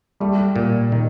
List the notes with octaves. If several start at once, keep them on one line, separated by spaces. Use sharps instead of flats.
G3 A3
A#2
D#3